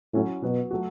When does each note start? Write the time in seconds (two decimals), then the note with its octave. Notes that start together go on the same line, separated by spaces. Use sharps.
0.13 A2 F#3 C#4 E4
0.42 B2 F#3 B3 F#4
0.71 F#3 A3 F#4